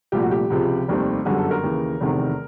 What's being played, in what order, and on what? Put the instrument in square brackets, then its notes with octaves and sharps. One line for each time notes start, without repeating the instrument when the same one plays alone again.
[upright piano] C2 A#2 F3 A3 G4
F#4
G4
C#2 C3 F3 G#3
F1 D#2 D#3 G3 C4
G1 F#2 D3 G3 G#4
A4
A#4
D#2 C#3 E3
F1 E2 C3 D#3